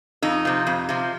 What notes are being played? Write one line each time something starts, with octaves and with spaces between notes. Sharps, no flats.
F2 D#4
C3 F3
F2
C3 F3